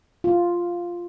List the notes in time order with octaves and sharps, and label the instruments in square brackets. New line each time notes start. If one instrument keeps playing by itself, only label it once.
[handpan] F4